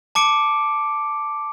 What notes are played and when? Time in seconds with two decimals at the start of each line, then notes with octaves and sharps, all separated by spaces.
0.15 A5 D6 C#7 D7